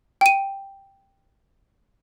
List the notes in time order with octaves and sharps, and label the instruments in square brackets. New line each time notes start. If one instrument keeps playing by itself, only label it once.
[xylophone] G5 D#7